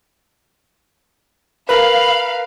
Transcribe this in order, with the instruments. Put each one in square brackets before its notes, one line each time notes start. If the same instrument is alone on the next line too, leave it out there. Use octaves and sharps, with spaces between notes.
[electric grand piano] A#4 B4 [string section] F5 [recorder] B5